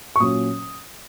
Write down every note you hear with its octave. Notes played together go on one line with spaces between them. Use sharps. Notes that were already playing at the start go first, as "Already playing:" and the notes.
C#6
A#2 F#3 A#3 C#4 D#6